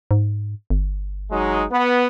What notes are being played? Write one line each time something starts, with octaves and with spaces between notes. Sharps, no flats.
G#2
G1
F#3 G#3 D#4
B3